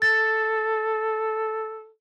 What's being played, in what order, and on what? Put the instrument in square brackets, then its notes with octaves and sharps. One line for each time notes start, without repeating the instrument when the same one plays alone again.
[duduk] A4 [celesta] A6